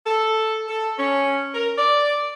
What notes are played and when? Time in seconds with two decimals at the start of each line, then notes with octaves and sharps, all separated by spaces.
0.05 A4
0.68 A4
0.97 C#4
1.54 A#4
1.77 D5